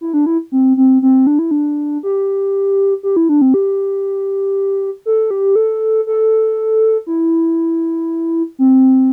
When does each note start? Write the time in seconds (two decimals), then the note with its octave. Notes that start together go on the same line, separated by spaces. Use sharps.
0.01 E4
0.13 D4
0.26 E4
0.52 C4
0.77 C4
1.02 C4
1.27 D4
1.39 E4
1.51 D4
2.03 G4
3.03 G4
3.16 E4
3.29 D4
3.41 C4
3.54 G4
5.06 A4
5.31 G4
5.56 A4
6.07 A4
7.07 E4
8.59 C4